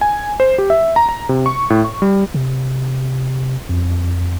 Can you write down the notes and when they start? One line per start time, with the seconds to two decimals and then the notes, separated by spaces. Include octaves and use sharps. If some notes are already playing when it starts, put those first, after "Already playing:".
0.01 G#5
0.40 C5
0.58 G4
0.70 E5
0.96 A#5
1.09 A#5
1.29 C3
1.46 C#6
1.70 A2
1.84 C#6
2.02 G3
2.34 C3
3.69 F2